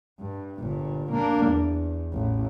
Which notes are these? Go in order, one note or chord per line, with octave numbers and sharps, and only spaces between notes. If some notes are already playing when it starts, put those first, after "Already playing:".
G2
G1 A#2
A#3 D4
E2
A1